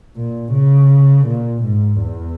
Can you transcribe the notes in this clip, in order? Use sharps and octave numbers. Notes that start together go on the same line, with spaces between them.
A#2
C#3
A#2
G#2
E2